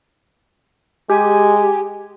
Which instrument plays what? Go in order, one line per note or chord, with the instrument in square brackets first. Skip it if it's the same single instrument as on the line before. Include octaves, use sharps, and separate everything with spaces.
[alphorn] G#3 [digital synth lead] G4 [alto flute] G#5